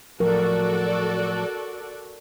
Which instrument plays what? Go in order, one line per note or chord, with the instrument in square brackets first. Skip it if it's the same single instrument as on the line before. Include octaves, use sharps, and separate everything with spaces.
[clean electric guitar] A2 F3 F#3 [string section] F#4 A4 D5 [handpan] A#4